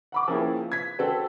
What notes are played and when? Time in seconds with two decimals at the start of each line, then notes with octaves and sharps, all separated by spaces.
0.12 F#5 B5 D6
0.28 F3 A#3 C4 C#4 E4 G#4
0.72 G#6 B6
0.99 A3 C4 F#4 A4